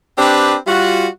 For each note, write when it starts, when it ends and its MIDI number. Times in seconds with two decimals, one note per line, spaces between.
0.18 0.57 60
0.18 0.57 62
0.18 0.57 67
0.18 0.57 71
0.67 1.08 55
0.67 1.08 65
0.67 1.08 66